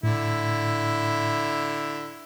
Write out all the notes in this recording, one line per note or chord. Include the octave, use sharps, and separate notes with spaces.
A2 D3 E4